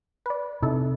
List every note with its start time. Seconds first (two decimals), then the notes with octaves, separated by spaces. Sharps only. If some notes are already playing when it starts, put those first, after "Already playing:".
0.26 B4 D5
0.62 C3 D#4 E4 A4